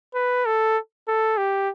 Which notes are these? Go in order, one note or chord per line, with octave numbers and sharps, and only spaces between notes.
B4
A4
A4
G4